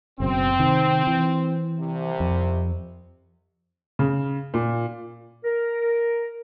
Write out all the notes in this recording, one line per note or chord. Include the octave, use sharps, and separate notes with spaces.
F#1 F#2 B2 C4
C3 D#3
E3
C2 C3
F2
C#3
A#2
A#4